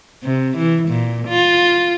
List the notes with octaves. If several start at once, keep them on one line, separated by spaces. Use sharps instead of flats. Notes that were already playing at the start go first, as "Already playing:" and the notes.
C3
E3
A#2
F4